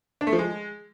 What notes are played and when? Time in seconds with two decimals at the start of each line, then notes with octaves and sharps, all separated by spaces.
0.21 D4
0.27 A3
0.33 F3
0.39 G#3